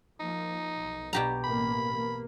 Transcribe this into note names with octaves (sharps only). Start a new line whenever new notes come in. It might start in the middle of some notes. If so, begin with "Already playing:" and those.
F3 A#3 D#4
B1
B2 G4 A#5
A1 A#3 B5
A#3